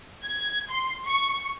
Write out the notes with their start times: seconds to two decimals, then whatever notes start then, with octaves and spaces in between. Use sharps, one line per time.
0.25 G#6
0.70 C6
1.06 C#6